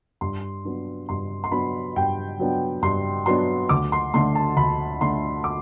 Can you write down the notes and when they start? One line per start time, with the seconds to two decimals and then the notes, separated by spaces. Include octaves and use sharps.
0.21 G2 C6
0.65 F#3 B3 D4
1.09 G2 C6
1.44 C6
1.52 F#3 B3 D4 B5
1.96 G2 G5
2.39 F#3 B3 D4
2.82 G2 C6
3.26 F#3 B3 D4 C6
3.69 D2 D6
3.92 C6
4.14 D3 A3 C6
4.35 A5
4.57 D2 B5
5.01 D3 A3 C6
5.44 D6